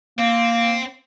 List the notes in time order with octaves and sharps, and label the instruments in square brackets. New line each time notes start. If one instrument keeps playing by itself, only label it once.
[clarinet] A#3 [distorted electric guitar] C4